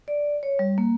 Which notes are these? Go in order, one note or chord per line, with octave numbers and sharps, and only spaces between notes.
D5
C#5
G3
A#3